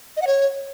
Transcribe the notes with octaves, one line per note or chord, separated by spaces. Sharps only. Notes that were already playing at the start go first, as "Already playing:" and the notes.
D#5
F#5
C#5